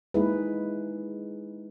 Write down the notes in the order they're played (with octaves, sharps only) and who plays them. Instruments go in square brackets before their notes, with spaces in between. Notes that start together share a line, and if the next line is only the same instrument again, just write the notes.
[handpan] G#3 A#3 D#4 E4 G#4 B4